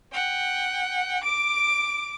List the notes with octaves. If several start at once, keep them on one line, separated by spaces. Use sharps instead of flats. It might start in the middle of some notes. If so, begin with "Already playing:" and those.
F#5 G5
D6 D7